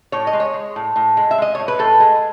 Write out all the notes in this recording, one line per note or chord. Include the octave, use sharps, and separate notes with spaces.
A2 C#5
D#5
G#3
C#5
G#3
A2
A2
G#3
E5
G#3 D#5
A2 C#5
B4
A2 A4
G#3